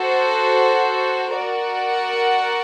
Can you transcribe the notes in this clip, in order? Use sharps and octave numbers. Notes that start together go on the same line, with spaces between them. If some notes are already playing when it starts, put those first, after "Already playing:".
Already playing: F#4 A4 C5
F#4 A#4 D5 F#5